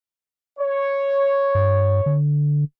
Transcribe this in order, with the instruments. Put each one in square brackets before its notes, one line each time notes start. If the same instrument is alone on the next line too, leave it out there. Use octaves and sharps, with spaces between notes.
[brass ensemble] C#5
[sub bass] G2
D3